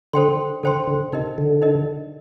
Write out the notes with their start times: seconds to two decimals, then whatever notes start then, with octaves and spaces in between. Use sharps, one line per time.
0.13 D3 A4 C5 G5 C6
0.63 D3 A4 C5 G5 C6
0.87 D3
1.13 C3 D#4 A#4 D#5
1.38 D3
1.62 D#4 A#4 D#5